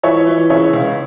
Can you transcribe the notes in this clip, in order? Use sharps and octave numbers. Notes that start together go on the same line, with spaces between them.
E3 C#5 E5
E3
C#3 C#5 E5
C#2